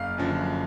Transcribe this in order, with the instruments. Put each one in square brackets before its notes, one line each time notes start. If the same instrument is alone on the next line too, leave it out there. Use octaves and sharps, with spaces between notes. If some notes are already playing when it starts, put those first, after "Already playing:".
Already playing: [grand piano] F#1 F5
F#2 D3 F3